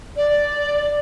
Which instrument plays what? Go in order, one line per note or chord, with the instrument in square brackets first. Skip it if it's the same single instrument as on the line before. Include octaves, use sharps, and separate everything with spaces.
[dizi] D5